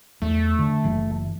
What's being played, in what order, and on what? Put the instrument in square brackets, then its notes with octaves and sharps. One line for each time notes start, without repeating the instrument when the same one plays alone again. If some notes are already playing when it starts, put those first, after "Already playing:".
[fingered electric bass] E2 [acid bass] A3
[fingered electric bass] D3
F#1 E3